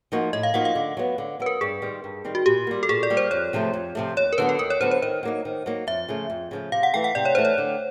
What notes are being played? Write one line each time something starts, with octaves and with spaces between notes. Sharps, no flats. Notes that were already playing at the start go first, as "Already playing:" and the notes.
F3 A#3 D#4 F#4
A2 D#5
F5
F3 A#3 D#4 F#4 F#5
F5
D3
F#3 B3
D3
F#3 B3 B4
A#4
G2 G#4
D#3 G3 C4
G2
D#3 G3 C4
F#4
A#2 G4
G3 A#3
A4
A#2 G#4
D5
G3 A#3
C5
F2 C#5
C3 F3 A3
F2
C3 F3 A3
D#2 C#5
A#4
D3 F#3 B3 B4
A4
D#2 A#4
C#5
D3 F#3 B3 C5
C5
D#3 C5
F#3 A#3 D#4
D#3
F#3 A#3 D#4
F2 E5
C#3 F3 A3
F2
C#3 F3 A3
C3 F5
F#5
E3 A3 G5
F#5
C3 D5
C#5
E3 A3 C5
C#5
D3